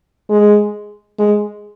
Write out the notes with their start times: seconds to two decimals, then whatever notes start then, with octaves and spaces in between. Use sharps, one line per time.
0.29 G#3
1.19 G#3